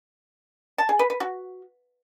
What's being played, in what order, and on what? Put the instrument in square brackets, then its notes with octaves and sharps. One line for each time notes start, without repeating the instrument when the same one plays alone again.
[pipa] A5
G#4
B4
B4
F#4